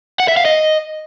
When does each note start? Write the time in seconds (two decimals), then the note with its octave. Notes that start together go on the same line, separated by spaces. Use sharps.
0.20 F#5
0.28 E5
0.37 F5
0.45 D#5